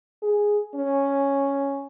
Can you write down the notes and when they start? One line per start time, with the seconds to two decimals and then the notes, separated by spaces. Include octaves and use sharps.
0.22 G#4
0.75 C#4